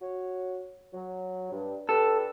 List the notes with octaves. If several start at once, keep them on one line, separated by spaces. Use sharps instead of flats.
F#4 C#5
F#3
G2
D3 G4 A4 B4